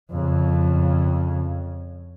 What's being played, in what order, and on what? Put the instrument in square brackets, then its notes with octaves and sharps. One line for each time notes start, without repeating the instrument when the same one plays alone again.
[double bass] F2 C#3